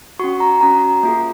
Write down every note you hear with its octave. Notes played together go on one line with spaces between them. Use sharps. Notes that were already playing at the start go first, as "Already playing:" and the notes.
C#4 F#4 C#6
A#5
C#4 F#4 A#5
A#3 F4 G#4